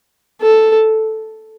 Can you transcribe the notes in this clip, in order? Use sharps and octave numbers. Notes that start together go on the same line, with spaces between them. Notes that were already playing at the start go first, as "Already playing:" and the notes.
A4